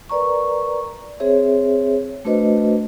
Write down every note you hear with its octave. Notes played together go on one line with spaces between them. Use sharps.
A#4 B4 D5 A#5 C#6
C4 G#4 C5 C#5 E5
A3 D4 F#4 B4 C5 D#5